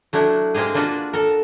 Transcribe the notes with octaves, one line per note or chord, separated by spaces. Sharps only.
F#3 A3 D4 E4
G#3 A#3 C4 G4 G#4
A#3 D4 F4 F#4 B4
A4 A#4